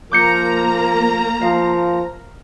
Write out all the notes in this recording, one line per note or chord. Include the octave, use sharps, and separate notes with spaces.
F3 A#3 A#5 D6 G6 C#7
F3 F5